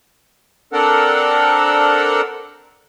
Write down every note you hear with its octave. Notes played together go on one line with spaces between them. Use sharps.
C4 D4 A4 A#4 F#5